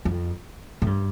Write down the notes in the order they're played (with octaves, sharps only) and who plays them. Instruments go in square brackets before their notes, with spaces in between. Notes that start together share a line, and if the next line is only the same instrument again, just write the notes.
[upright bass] F2
A2
G2